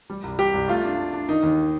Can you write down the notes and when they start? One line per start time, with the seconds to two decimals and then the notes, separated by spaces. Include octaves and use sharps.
0.10 G3
0.23 C2
0.39 G3 G4
0.54 C2
0.68 A3 F4
0.84 D4
0.98 D4
1.13 D4
1.28 D#3 D#4
1.43 D#2